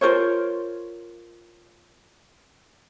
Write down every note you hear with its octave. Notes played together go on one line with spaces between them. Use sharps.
F4 A#4 C5 C#5